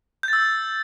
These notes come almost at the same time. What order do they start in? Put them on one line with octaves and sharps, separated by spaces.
G6 A6 E6